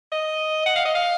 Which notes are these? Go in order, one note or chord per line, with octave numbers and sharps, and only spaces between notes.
D#5
F#5
F5
D#5
F5